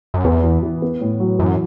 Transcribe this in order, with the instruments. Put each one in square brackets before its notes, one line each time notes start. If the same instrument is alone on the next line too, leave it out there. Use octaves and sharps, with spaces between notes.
[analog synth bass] F#2
[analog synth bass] E2 [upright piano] B3
[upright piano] E3
E3
B3
A2
F#3
[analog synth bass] F#2 [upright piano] E3